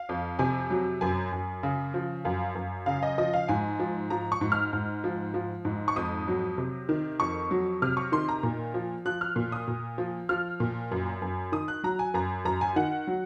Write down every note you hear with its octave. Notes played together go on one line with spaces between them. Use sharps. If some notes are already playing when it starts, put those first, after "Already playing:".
Already playing: F5
F2
C3 G#5
F#3
F#2 G#5
F#2
C#3
F3
F#2 F5
F#2
C#3 F5
D#5
F3 D#5
F5
G#2 G#5
F3
F3 A#5
C#6
G#2
F6
G#2
F3
F3
G#2
C#6
F2 D#6
F#3
C3
D#3
F2 C#6
F#3
C3 F6
C#6
D#3 C6
A#5
A#2
F3
F3 F#6
F6
A#2
D#6
A#2
F3
F3 F6
A#2
F#2
F#2
D#3 D#6
F#6
F#3 A#5
G#5
F#2 A#5
F#2 A#5
G#5
D#3 F#5
F#3